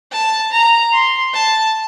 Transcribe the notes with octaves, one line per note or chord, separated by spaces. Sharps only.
A5
A#5
C6
A5